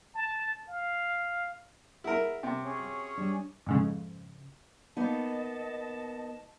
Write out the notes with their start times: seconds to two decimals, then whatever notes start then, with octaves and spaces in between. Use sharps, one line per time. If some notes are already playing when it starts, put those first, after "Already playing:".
0.15 A5
0.68 F5
2.04 E4 G#4 A#4 B4 F#5
2.43 C3
2.65 C#4 G#4 C#5
2.80 F#4
3.17 G3 D4
3.66 F2 G#2 C#3
4.97 A#3 B3 D#4 D#5 A5